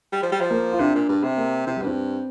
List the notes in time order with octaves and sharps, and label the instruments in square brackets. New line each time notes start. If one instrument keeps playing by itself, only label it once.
[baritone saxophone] G3
F3
G3
F3
[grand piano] A#3
F4
[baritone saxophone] C3 [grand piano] D4
[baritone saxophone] A#2
G2
C3
[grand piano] A#3
[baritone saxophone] C3 [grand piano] C4
[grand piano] G3
[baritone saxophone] G2 [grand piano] C4